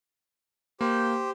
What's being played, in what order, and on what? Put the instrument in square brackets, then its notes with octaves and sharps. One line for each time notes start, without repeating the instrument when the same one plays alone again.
[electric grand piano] A#3 [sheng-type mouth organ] G4 C5